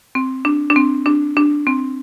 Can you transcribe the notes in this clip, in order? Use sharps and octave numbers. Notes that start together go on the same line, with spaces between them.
C4
D4
D4
C4
D4
D4
C4